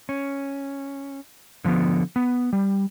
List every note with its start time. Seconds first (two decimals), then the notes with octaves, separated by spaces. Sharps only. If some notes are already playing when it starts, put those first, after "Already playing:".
0.09 C#4
1.65 D3 F3 A#3 B3
2.16 B3
2.53 G3